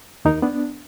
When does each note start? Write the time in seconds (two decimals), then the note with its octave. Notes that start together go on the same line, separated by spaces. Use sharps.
0.25 D#2 D#4 A#4
0.42 B3 D4